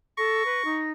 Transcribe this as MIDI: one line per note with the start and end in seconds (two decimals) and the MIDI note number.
0.18 0.43 69
0.18 0.80 85
0.18 0.90 94
0.45 0.62 71
0.64 0.92 63